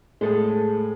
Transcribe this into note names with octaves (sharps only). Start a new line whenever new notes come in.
A2 G#3 G#4 A4 C5